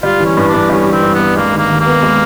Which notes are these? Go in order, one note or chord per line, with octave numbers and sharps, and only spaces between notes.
G3 F4
E3
C#4
G2
D4
G2
G3 C#4
E3
C4
G2
G2 B3
G#3 A#3
D#3
A#3
D#2
A#3
B3
G#3